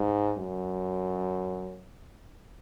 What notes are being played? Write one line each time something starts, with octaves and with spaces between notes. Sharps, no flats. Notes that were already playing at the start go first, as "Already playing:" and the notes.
Already playing: G#2
F#2